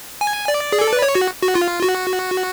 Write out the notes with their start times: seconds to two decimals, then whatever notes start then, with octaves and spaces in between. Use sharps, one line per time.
0.21 G#5
0.48 D5
0.72 G#4
0.81 A4
0.93 B4
1.02 C#5
1.15 F#4
1.42 F#4
1.55 F4
1.82 F#4